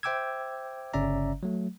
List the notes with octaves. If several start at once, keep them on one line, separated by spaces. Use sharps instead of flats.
C5 E5 G5 D6 E6 G#6
G1 C#3 C#4 D5 E5 A#5
F#3 A3